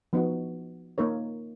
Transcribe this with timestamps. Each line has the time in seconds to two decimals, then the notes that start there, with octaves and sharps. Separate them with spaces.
0.13 F3 B3 D#4 F#4
0.98 A#3 D#4 A#4 C#5